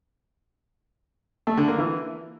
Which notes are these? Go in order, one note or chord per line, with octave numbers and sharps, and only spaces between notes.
A3
D3
A#3
E3